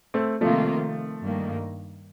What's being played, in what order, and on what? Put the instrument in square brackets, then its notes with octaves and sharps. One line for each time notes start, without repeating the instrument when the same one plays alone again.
[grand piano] A3 C4
[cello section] C3 D#3 A#3 F4 [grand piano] F3 A3
[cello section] G2 D#3 A#3